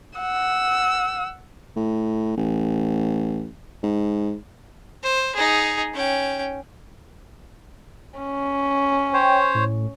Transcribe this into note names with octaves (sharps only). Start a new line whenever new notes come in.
F#5 E6
A2
A1
G#2
C5
D#4 G#4
C#4 G5
C#4
C5 C#5 G5
A2